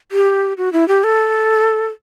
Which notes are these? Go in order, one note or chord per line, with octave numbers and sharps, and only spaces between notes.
G4
F#4
E4
G4
A4